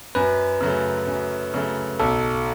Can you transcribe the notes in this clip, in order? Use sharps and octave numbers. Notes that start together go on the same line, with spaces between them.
F#2 B4
C#3 F#3 A3
F#2
C#3 F#3 A3
B1 A4